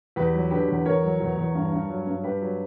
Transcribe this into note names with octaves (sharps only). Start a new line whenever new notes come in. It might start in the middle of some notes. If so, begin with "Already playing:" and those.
E2 G4 B4
F#3
D3 G4 B4
E2
E2 A#4 C#5
F#3
E2
E2
G2
G2
F#3
G2
G2 G4 B4
F#3